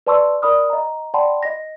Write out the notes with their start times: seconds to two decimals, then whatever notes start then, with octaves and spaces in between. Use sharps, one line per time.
0.07 B4 D5 A5 C6 C#6 E6
0.42 A#4 D5 B5 D#6 F6
0.70 D#5 A#5
1.14 D5 F#5 G5 A5 B5 C6
1.43 D#5 A#6